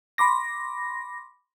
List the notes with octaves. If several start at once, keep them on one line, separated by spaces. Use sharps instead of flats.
B5 C6 D6 A#6